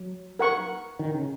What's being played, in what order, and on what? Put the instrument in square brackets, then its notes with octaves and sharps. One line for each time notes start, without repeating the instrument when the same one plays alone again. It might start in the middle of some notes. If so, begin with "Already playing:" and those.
Already playing: [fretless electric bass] F#3
[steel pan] A#4 F#5 C#6
[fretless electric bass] D#3
C#3